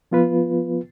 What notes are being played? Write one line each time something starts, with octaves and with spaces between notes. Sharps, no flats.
F3 B3 F4 B4